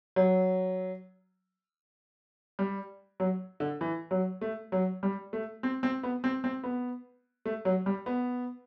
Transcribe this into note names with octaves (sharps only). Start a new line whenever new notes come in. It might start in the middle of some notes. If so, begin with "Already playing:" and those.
F#3
G3
F#3
D3
E3
F#3
A3
F#3
G3
A3
C4
C4
B3
C4
C4
B3
A3
F#3
G3
B3